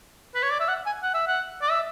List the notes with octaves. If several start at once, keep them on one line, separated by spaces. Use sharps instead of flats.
B4
C#5
D5
E5
F#5
G#5
F#5
E5
F#5
D5
E5